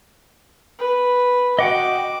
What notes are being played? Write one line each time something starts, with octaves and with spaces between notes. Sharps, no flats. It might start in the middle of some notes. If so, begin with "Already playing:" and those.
B4
F#4 D#5 F#5 G5 D6